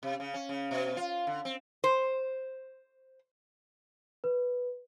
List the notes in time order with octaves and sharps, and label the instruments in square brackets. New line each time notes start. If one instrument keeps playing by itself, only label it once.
[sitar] C3
C#3
C#4
C#3
B2
F4
D3
C4
[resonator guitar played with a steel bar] C5
[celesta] B4